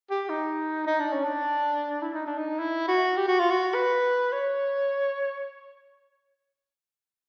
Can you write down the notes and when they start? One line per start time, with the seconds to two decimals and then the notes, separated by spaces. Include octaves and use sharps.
0.10 G4
0.29 D#4
0.87 D#4
1.00 D4
1.12 C#4
1.24 D4
2.02 E4
2.14 D#4
2.26 D4
2.38 D#4
2.59 E4
2.88 F#4
3.17 G4
3.28 F#4
3.39 F4
3.50 F#4
3.74 B4
4.32 C#5